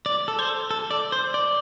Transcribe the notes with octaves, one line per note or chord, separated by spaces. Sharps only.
D5
A4
C5
A4
D5
C5
D5